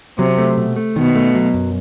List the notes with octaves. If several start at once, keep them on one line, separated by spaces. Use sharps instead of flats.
C3 F#3
A3
B2
A3
B2 D#3
A3
F#3
F#2